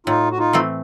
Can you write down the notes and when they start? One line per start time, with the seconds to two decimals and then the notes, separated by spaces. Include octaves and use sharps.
0.07 A2 D#4 F4
0.31 F#4
0.38 D#4 F4
0.53 E3 A3 C4